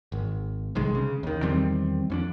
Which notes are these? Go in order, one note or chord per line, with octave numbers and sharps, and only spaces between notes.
G#1
B1 C3 D#3 G#3
C#3
D#2 D#3
E2 D#3 G3 C4
F2 C#4 D4